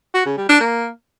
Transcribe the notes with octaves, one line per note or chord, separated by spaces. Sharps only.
F#4
C#3
G3
D4
A#3